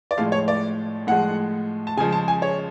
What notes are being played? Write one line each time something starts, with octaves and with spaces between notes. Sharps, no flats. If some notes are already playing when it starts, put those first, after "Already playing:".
D5
A2 F3 G#3 F5
C#5
D5
A2 F3 G#3 F#5
A5
C#3 F3 G#3 G#5
A5
G#5
C#5